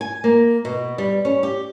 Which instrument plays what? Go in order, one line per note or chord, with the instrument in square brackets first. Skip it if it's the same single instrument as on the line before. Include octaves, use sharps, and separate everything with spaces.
[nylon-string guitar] G#5
A#3
B2
G3
C#4
G4